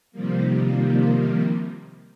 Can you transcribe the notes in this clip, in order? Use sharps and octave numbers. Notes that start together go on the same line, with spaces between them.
C3 D#3 F3 G3 A#3